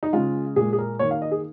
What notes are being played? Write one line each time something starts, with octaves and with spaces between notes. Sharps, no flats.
D#4
C#3 G#3 F4
A#2 G#3 G#4
G#4
A#4
D#3 A#3 C#5
F5
D#5
G#4